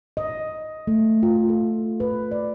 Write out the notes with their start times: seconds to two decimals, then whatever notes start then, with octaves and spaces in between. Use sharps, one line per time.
0.17 D#5
0.87 A3
1.23 F4
1.49 A4
2.00 B4
2.31 D5